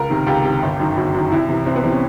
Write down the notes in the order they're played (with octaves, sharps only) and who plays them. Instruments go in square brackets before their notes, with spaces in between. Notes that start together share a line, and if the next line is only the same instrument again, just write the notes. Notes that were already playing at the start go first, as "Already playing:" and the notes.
Already playing: [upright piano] C#2 A#4
C3 D#3
C#2 G4
C3 D#3
G1
F#2 D#3
G1 F#4
F#2 D#3
C2 E4
C3 E3
C2 C4
B3
C3 E3 C4
C#4